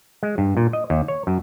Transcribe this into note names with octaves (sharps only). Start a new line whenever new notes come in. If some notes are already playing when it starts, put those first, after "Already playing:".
G#3
G2
A#2
D#5
D#2
C#5
F#2